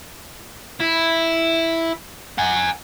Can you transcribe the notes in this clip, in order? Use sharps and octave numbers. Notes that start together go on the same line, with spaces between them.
E4
F#5 G#5